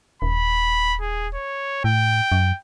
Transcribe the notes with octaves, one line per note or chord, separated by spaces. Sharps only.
D#1 B5
G#4
C#5
A2 G5
F#2